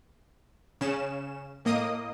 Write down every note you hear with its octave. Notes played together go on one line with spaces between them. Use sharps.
C#3 C#4 E7
A2 A#3 D#5 D#6